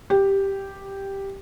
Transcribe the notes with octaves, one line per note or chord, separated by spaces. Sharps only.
G4